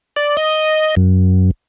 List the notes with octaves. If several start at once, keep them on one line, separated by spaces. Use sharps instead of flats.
D5
D#5
F#2